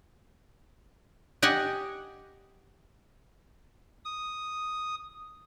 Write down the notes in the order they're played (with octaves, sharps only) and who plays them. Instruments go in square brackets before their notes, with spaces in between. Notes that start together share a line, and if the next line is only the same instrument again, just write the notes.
[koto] G4 D#5 F#5 G#5
[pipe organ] D#6